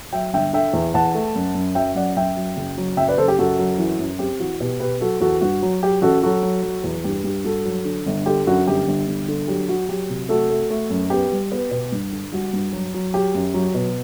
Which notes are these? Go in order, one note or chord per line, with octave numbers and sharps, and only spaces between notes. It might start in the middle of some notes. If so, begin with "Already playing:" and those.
F#3 E5 G5
G1 E5 G5
D3 E5 G5
E2
E2 F#5 A5
A3
F#2
F#2
F#3 E5 G5
F#2 D5 F#5
F#2 E5 G5
F#3
F#1
F#3
F#1 E5 G5
B4 D5
F#1 A4 C5
G4
F#2 F#4 A4
F#3
E3
F#2
C4 G4
E3 F#4
B2 G4
B2 G4 B4
F#3 F#4 A4
E2 F#4 A4
G2 F#4
F#3
F#3 G4
A1 F#4 A4
F#3 F#4 A4
F#3
F#3
E2
G2 G4
G2 G4
G2 F#4 A4
F#3
D3
G1
D3 G4
F#2 F#4
G1 G4
G1
G1
D3
F#3 G4
F#3 F#4
F#3 G4
C3
A3 F#4 A4
A3
A3
F#2
B3 G4
G3
B3
B2
G2
D3
G3 F#4
G2
F#3
F#3
F#3 G4
F#2
F#3
B2